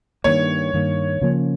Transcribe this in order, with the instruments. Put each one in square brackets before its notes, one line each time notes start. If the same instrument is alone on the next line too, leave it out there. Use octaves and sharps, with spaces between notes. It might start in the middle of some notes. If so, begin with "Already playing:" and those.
[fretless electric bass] G2 D#3 A#3 [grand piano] C#5
[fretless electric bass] G2 D#3 A#3
C#3 F3 A#3 C#4